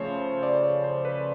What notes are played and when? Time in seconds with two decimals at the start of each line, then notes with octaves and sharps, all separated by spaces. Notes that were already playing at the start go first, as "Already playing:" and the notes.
Already playing: C#3 F3 A3 C5 C#5
0.43 D5
0.63 C#5
0.84 C5
1.05 B4